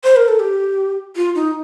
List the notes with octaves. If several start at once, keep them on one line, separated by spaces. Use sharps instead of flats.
C5
A#4
A4
G4
F4
D#4